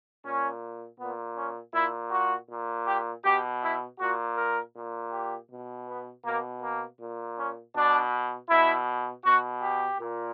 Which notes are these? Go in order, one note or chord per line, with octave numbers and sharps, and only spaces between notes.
A#2 C#4
A#2 B3
C#4
A#2 E4
F#4
A#2
G4
B2 G4
E4
A#2 F#4
A#4
A#2
G4
B2
B3
B2 A#3
A#3
A#2
C#4
B2 D4
B2 E4
B2 F#4
G4
A#2